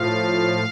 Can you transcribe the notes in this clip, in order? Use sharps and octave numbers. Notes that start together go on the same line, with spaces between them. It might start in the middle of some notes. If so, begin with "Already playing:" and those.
Already playing: A2 F3 F5